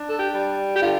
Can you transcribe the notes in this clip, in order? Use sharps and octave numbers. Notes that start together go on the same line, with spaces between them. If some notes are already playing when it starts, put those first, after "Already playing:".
Already playing: D4
A4
G4
G3
G4
D3 F4